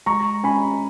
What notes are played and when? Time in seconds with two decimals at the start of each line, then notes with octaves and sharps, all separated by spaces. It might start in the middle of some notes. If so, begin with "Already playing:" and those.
0.06 G#3 A#5 C#6
0.44 C#4 G#5 B5